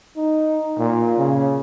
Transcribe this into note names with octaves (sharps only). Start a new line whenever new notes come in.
D#4
A#2
C#3